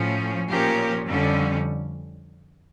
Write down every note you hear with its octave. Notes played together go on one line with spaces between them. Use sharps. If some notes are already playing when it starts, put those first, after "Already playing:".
Already playing: A2 F3 C#4
A#2 F3 C#4 G4 A#4
F2 D3 G3 C#4